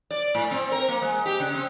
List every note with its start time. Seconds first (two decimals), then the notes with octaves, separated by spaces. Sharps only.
0.11 D5
0.35 A2
0.51 C4
0.72 A#4
0.89 A#3
1.02 G#3
1.25 G4
1.40 C#3
1.55 C4